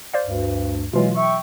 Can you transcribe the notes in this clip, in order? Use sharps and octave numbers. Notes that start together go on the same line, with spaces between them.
C5 D5 F5
D2 G2
B2 E3 F#3 G#3 F4
E5 G5 C#6